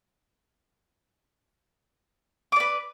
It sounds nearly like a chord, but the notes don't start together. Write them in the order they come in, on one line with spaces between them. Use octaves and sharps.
D6 D5 B4